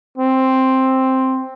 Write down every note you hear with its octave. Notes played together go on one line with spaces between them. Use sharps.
C4